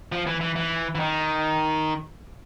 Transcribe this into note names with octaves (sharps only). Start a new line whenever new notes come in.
F3
E3
E3
E3
E3
D#3